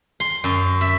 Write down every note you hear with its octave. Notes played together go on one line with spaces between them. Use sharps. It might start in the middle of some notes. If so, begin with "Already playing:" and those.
C6
F#2
E5